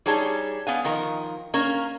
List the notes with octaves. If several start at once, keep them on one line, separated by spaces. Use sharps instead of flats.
G3 D#4 G#4 C#5 A5
B3 F5 G#5
D#3 F3 A#4
A#3 C#4 A#4